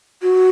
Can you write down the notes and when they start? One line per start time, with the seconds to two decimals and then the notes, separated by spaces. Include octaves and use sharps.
0.22 F#4